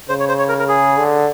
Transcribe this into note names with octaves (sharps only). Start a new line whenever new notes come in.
C#3 C5
C#5
C5
C#5
A#4
A#4
G#4
D3